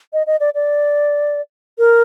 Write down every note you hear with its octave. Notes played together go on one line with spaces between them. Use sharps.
D#5
D#5
D5
D5
A#4